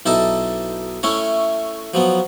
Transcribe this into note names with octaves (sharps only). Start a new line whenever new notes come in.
B1 D#4 E4 A4 A5
A3 C#4 E4 C#5
F3 F#3 B3